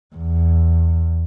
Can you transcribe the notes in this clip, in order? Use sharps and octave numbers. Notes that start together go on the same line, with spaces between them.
E2